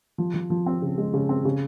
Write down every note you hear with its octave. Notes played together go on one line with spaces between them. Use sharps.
F3
F3
F3
C4
C#3
G#3
C#3
C4
C#3